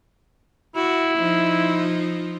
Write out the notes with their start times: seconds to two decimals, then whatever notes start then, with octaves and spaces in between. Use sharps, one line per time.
0.76 E4 F#4
1.18 F3 D#4 F4